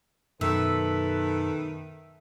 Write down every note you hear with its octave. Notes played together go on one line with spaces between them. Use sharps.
F#2 B2 D#3 A4 B4 E5